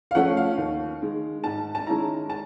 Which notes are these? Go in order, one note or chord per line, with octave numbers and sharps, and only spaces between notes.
F5
F3 A3 C#4 F#5
F5
D#2
D#3 G#3
G#2 A5
A5
D#3 G#3 C#4 E4 A#5
A5